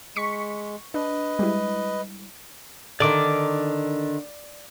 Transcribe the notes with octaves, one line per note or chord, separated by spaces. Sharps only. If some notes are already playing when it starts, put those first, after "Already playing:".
G#3 C#6 B6 C#7
D4 B4 D#5
G3 G#3 E4
D3 D#3 D5 D6